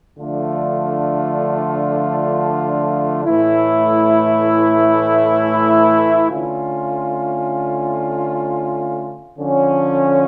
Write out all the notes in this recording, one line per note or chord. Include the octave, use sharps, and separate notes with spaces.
D3 F3 A3 D4 F4
A2 E3 A3 E4
D3 A3 C#4 F4
D3 F3 C#4 F4